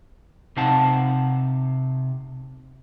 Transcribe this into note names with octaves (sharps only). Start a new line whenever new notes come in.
C3 D#4 C5 F5 F#5 A5